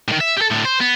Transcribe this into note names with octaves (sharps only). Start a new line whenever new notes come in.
A2 D#3
E5
G4 A4
A2 D3
C5
B3